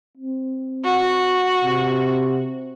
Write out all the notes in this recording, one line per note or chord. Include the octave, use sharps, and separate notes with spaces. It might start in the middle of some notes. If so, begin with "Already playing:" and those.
C4
F#4
C3